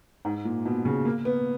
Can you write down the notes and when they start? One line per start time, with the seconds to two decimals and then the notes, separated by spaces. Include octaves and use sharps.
0.25 G#2
0.45 A#2
0.65 B2
0.85 C#3
1.05 A#3
1.25 B3